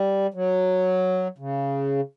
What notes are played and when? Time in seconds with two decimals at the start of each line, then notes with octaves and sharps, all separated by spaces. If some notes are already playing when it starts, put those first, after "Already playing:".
Already playing: G3
0.34 F#3
1.38 C#3